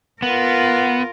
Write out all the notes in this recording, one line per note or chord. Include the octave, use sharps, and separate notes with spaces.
B3 F4 A#4